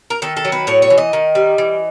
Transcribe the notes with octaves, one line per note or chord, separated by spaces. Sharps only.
A#4
D#3 A4
A4
F#3
B4
A2 C#5
C#5
E3
D#5
D#3
G3
E3